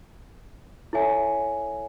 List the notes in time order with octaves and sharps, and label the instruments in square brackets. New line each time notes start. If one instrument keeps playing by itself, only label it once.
[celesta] E4 A4 C#5 E5 G#5